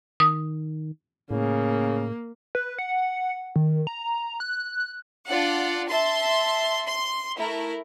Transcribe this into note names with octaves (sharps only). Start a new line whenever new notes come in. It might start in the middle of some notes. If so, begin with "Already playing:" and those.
D#3 D#6
A2 C#3 A#3
B4
F#5
D#3
A#5
F#6
D4 F4 D5 F#5
E5 A5 C6
C6
A3 E4 A#4